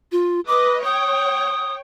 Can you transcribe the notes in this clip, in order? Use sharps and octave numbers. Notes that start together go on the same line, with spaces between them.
F4
B4 D#5 D6
C#5 G5 D#6